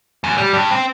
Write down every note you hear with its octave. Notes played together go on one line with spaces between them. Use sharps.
F#2
G3
G2
C4